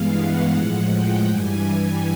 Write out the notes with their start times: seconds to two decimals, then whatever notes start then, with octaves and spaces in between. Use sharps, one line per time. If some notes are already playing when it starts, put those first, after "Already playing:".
Already playing: G2 E3 G#3 B3 F5
0.15 F#5
0.53 A2 F3 G#3
0.89 G5
1.26 G2 E3 G3 G#5